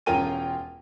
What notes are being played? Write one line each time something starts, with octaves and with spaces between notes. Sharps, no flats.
E1 C#4 F4 A#4 G5 D#7